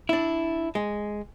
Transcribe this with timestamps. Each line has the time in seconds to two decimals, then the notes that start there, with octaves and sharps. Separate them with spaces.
0.09 D4 E4
0.75 G#3